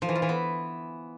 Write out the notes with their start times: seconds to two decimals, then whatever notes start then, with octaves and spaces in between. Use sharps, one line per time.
0.02 F3
0.09 E3
0.15 F4
0.22 E3
0.29 B3